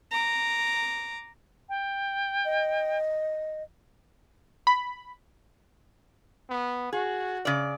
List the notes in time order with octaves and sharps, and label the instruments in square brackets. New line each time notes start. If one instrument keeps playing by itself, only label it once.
[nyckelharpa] A#5 D6
[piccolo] G5
[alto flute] D#5
[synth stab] B5
[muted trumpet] B3
[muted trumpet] F#4 [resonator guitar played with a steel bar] G#4
[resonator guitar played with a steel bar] C#3 D5